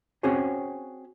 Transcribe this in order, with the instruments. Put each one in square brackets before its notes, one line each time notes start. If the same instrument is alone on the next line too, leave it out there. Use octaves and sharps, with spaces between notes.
[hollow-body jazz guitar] C4 C#4 F#4 G#4 C5 C#5